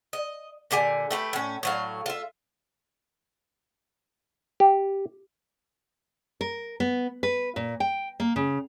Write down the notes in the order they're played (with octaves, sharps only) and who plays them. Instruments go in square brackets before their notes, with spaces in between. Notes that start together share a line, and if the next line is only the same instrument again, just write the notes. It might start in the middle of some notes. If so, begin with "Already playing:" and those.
[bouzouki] D#5
A#2 D3 G4 G#5
A3 G4 B4
A2 C#4
A2 F#3 F5
F4 E5
[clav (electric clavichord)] G4
[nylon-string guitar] A#4
B3
B4
A#2
G5
A#3
C#3